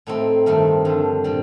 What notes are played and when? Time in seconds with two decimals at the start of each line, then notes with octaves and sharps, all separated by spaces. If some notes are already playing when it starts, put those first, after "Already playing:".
0.07 A2 A3 C4 D#4
0.46 G2 D#3 A3 C4
0.85 G2 D3 F3
1.24 A#2 G3 C4